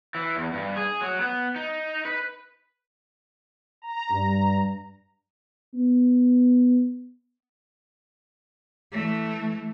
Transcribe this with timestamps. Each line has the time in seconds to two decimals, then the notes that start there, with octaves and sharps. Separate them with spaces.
0.15 E3
0.36 E2
0.53 G2
0.76 G#4
1.01 F#3
1.21 B3
1.56 D#4
2.05 B4
3.82 A#5
4.11 G2
5.74 B3
8.92 E3 A3